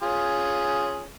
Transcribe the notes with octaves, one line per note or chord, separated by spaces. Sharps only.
C#4 F4 G#4